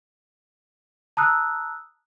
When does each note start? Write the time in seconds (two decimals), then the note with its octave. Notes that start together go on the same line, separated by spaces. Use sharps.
1.17 A5 A#5 D#6 E6 F#6